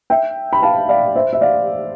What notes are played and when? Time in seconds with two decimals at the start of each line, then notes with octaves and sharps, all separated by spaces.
0.10 E5 G5
0.53 B5
0.62 F5 A5
0.89 D5 F5
1.16 C5 E5
1.33 E5
1.41 D5 F5